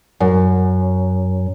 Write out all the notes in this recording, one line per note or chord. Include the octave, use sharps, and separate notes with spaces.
F#2